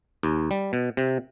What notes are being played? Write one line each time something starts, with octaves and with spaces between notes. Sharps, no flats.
D#2
G3
B2
C3